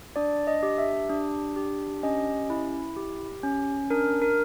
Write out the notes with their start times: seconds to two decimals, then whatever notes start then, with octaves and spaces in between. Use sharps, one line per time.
0.16 D4 D5
0.47 D#5
0.63 G4
0.78 E5
1.09 D4
1.56 G4
2.03 C#4 D#5
2.50 E4
2.97 G4
3.43 C#4
3.90 D4 A#4
4.22 A#4